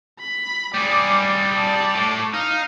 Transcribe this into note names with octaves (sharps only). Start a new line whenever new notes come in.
B5
G3 G#4 D5
D5 A5
A2
D#4 F5 F6